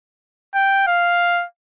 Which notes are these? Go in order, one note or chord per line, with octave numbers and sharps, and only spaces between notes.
G5
F5